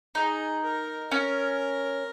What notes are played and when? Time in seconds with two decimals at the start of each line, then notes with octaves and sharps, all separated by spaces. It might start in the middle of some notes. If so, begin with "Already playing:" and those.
0.15 D#4 G#4
0.64 A#4
1.11 C#4 A#4